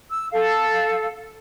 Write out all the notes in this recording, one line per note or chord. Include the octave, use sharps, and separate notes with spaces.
E6
A4 F5